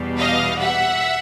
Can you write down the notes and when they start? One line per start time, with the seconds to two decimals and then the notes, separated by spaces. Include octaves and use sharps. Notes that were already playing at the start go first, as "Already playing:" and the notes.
Already playing: E2 B2 G3
0.18 D#5 F5
0.60 E5 F#5